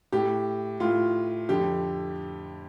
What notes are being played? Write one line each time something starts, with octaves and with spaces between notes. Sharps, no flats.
A2 G4
A2 F4
F2 D3 G4